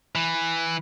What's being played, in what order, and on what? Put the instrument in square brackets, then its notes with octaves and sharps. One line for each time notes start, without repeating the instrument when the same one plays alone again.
[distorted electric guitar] E3